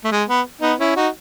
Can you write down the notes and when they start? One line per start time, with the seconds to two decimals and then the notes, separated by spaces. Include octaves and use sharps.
0.04 A3
0.12 G#3
0.29 B3
0.62 B3 D#4
0.79 C#4 E4
0.96 D#4 F#4